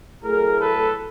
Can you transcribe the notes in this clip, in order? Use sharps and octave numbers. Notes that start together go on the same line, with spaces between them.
A2 F#3 A3 G#4 A#4
A4 B4